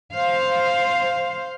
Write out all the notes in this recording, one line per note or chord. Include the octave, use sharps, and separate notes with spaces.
C5 F5